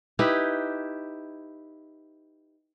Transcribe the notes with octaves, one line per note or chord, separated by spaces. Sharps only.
D#4 E4 G4 B4